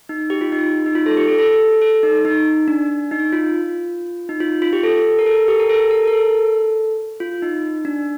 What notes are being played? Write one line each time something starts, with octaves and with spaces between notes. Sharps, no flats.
D#4
G4
F4
D#4
D#4
F4
A4
G4
A4
A4
A4
D#4
D#4
D4
D#4
F4
D#4
F4
F4
G4
A4
A#4
A4
G4
A#4
A4
A#4
A#4
A4
F4
D#4
D4